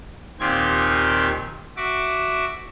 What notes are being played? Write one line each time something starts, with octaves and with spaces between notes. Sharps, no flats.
D#2 A#2 D#3 C4 G4 G#6
F#4 E5 D6